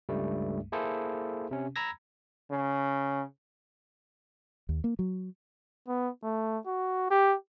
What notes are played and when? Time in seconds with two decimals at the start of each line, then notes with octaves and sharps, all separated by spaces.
0.09 C#2 G2 G3 A3
0.72 A#3 E4 G#4 A4 C5
1.51 C3 C#4
1.76 A#5 B5 E6 G#6 A#6
2.51 C#3
4.69 D#2
4.84 A#3
4.99 F#3
5.88 B3
6.23 A3
6.66 F#4
7.11 G4